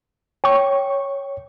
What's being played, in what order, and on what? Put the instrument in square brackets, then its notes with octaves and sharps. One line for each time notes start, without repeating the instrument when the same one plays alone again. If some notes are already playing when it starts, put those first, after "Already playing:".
[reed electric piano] C#5 [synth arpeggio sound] G5 C#6